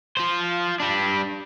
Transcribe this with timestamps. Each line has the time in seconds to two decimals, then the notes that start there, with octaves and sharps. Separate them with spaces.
0.17 F4 C5
0.80 G3 D4